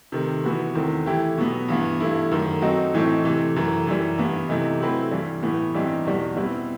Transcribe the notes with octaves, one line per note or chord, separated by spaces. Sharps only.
C3 D#3 A3
E3 B3 F#4 B4
E2 D#3 A3 C4
E3 A3 E4 G4
B2 F#3 B3
G2 E3 B3
G2 E3 A3 E4
F#2 D#3 A3
F#3 C4 D#4 F#4 A4
A2 E3 A3 C4 D#4
C3 E3 A3
F#2 E3 A3
F#2 E3 G3
G2 E3 B3
C3 E3 A3 D#4
F#3 A3 C4 E4 B4
G2 E3 G3
A2 E3 B3
G2 E3 G3 C4 D#4
E2 B2 G3
B2 G3 C4 E4 B4